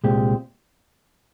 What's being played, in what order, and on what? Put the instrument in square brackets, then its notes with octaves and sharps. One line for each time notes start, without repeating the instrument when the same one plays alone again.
[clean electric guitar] C2 A#2 G#3 C4 G4